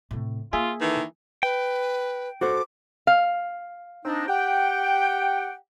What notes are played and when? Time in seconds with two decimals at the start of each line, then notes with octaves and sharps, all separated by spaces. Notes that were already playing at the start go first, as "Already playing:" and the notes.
0.11 A2 C3
0.53 A#3 F4 G#4 E5 G#5
0.81 D#3 E3 A4
1.43 B4 G5
2.41 F#4 A4 C5 D6
3.07 F5
4.04 C4 D4 D#4
4.27 G4 F#5 G5